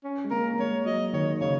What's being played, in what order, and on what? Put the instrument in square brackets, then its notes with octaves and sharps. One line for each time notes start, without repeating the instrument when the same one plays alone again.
[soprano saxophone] C#4
[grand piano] G#3
[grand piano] A#3 [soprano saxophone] A#4
[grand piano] A#3
[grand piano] G#3 [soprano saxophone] C#5
[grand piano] F#3 [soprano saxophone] D#5
[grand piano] D#3 [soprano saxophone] C#5
[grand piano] C#3 [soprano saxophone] C#5